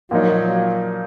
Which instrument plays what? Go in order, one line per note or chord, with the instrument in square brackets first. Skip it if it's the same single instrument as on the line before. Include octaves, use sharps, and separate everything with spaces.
[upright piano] A#2 F3 A#3 D#4 [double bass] F#3